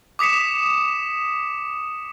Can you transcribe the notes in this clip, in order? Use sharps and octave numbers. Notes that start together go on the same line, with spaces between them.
D6 D#6 B6 C#7 E7